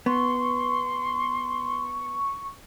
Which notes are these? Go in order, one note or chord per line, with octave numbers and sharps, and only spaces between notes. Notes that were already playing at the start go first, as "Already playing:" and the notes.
B3 C6 C#6